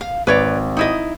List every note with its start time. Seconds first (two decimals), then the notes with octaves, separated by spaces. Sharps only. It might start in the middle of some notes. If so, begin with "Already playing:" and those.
0.01 F5
0.27 G#1 B4 C#5 D5
0.77 D#4 E4 D#5